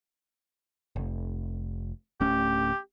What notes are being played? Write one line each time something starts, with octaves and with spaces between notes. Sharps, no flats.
F1
D1 A3 C#4 G4